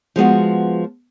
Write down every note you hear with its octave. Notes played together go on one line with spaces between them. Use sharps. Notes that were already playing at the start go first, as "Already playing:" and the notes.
F3 G#3 B3 F#4